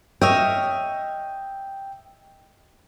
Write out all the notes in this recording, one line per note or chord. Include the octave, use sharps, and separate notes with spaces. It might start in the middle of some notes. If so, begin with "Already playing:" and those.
C#5 D#5 E5 G5 F6